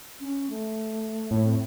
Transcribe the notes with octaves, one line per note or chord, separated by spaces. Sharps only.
C#4
A3
A2
C4